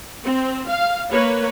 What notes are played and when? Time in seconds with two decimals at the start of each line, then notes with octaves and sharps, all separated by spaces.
0.24 C4
0.68 F5
1.11 A#3 B4 C#5